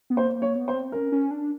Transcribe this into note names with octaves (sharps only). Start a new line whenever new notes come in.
B3
A#3 C5
A#3
C#5
B3
C5
C4
C#4 A#4
C#4
D4